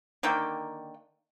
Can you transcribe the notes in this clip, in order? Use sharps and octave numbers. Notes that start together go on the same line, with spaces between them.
D3 D#3 A#3 G5